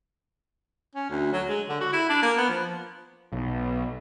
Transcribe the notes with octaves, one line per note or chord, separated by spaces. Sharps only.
C#4
D2
F#3
G#3
D3
F#4
E4
D4
A#3
B3
F3
B1